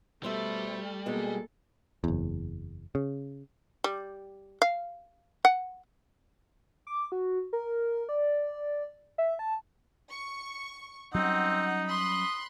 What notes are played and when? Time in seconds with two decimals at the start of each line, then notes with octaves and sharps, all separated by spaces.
0.23 B2 G3 A3 A4 C5 E5
1.06 B2 G#3 A#3 G#4 A4
2.04 F#1 E2
2.95 C#3
3.84 G3
4.62 F5
5.45 F#5
6.87 D6
7.12 F#4
7.53 A#4
8.09 D5
9.18 E5
9.39 A5
10.10 C#6
11.14 F#3 G3 C4 C#4 D#4 F#5
11.89 B5 C6 D#6 F#6